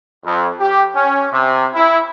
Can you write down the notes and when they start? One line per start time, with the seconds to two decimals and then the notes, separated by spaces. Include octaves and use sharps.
0.25 F2
0.60 G4
0.95 C#4
1.31 C3
1.74 E4